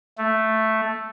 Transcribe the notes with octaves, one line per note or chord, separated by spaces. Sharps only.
A3